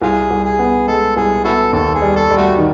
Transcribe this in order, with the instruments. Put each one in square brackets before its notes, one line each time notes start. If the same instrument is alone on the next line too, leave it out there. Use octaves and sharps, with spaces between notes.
[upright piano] C2 [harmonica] F4 G#4
[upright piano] C2
[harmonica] G#4
[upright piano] B3
[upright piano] G#3 [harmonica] A4
[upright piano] C2 [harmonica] G#4
[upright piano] B3 [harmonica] E4 F#4 A4
[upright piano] D#2 [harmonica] A4
[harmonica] G#4
[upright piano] G3
[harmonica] A4
[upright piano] G3
[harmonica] A3 F#4
[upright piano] D#3